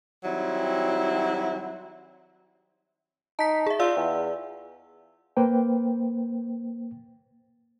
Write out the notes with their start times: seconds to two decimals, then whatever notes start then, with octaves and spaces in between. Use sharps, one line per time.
0.24 D#3 F#3 G3 C4 E4
3.39 D#4 A5 B6
3.66 G#4 E5
3.79 F4 D5 F5 E6
3.97 E2
5.37 A#3 B4 C5 G5